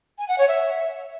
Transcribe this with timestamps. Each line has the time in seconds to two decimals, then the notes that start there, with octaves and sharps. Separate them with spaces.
0.18 G#5
0.28 F#5
0.38 C#5
0.48 E5